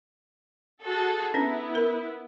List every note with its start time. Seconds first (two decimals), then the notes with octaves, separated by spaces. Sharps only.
0.83 F#4 G#4 A4
1.34 B3 C#4 D4 E4 B4
1.75 A#4